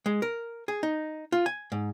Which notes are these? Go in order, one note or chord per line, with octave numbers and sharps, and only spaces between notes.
G#3
A#4
G#4
D#4
F4
G#5
G#2